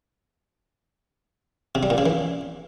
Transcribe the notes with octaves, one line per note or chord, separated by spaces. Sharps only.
C3
G3
A#2
C#3
E3